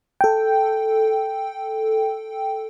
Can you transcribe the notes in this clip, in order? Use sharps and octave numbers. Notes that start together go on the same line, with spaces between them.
A4 G5